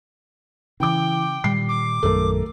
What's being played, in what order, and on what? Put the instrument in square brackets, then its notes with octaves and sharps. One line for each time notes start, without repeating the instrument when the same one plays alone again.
[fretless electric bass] C#3 [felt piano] E3 D6 [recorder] G5
[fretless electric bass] A#2 D#3 G3 [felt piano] C7
[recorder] D6
[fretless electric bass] A#1 F#2 D#3 [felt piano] A3 A#4